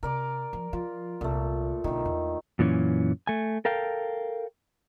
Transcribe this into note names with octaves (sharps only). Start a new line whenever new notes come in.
C3 A#4 D5 D6
F3
F3 F4
C2 A#2 A3
B1 D3 D#3
E2
F#2 A#2 E3 C#4
A3 G#5
A4 A#4 F5 G5